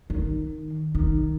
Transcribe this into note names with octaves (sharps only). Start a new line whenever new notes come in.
D#3
D#3